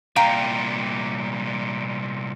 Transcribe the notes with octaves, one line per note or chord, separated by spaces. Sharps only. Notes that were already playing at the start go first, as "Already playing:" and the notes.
C2 A#2 F5 G5 A#5